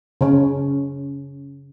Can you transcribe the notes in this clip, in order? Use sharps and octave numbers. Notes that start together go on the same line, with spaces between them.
C#3 C#4